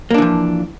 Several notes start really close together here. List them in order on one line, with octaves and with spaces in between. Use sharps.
A#3 D4 E3 F3